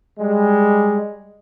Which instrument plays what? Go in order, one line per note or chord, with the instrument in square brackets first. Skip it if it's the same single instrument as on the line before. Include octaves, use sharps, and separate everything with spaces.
[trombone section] G3 G#3